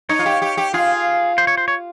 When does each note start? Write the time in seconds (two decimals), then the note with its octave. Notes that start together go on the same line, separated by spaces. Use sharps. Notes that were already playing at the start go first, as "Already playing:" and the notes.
0.09 D#4 C#5
0.19 F4
0.26 G4
0.42 G4
0.57 G4
0.74 F4 G#4
1.38 C5
1.47 C#5
1.57 C5
1.68 C#5